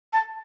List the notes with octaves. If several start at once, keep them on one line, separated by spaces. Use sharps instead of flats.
A5